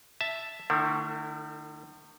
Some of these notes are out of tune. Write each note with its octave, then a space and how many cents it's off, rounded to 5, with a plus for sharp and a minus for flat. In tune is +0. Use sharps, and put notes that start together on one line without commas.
E5 +0 A5 +0
D#3 -45 A3 +30 E4 +0